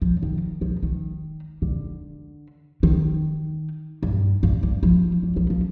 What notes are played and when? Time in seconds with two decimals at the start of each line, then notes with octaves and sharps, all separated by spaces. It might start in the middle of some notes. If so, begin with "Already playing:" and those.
0.02 F3
0.22 D#3
0.61 F3
0.83 D#3
1.62 D3
2.83 D#3
4.03 G2
4.43 G2
4.63 G2
4.83 F3
5.23 G3
5.36 F3
5.50 F3